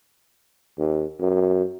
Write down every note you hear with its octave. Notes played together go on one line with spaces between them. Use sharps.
D#2
F#2